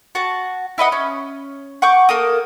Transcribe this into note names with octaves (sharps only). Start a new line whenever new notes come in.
F#4 A5
E4 B4 D#5 F#5
C#4
F#5 C#6 D6 G6
A#3 A4 A#4 D#6